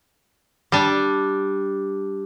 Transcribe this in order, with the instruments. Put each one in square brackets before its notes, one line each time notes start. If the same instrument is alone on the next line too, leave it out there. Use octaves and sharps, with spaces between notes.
[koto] G3 D4